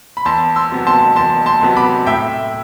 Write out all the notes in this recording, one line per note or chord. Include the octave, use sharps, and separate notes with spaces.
B5
E2 A5 C6
C6 E6
C3 F#3 B3
A5 C6
E2 A5 C6
A5 C6
C3 F#3 B3
B5 D6
A2 E5 G5